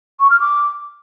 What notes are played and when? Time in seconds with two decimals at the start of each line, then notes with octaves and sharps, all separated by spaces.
0.20 C#6
0.30 F6
0.40 D6